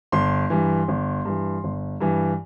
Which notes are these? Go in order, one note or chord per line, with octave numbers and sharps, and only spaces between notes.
G1 C6
G2 E3
G1
G2 E3
G1
G2 E3